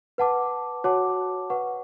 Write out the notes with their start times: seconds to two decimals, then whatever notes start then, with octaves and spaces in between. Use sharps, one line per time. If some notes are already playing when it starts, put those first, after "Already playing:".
0.18 B4 F#5 A5 D6
0.84 F#4 C#5 F#5 A5 D6
1.50 B4 F#5 C#6